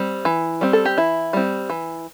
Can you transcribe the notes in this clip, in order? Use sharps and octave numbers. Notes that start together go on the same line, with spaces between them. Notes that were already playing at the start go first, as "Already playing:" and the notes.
Already playing: G3 C4
E3
G3 C4
A4
G4
E3 E4
G3 C4
E3